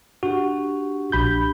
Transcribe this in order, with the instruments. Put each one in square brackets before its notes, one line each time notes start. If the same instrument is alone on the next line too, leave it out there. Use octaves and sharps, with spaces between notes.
[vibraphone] D4 G4 [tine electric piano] F#4
[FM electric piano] A#1 B5 G6 [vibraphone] D4 G4